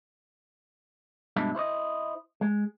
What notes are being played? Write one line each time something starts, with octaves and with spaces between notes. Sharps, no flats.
G2 B2 G#3 D4 E4
E4 C5 C#5 D#5
G#3